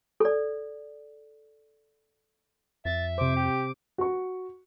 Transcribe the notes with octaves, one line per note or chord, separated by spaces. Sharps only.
A4 D5
F2 E5 A6
C3 C5 D6
G4
F#4 C#6